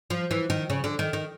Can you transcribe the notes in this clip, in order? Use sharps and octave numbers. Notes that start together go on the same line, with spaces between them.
F3
E3
D#3
C#3
D3
D#3
D#3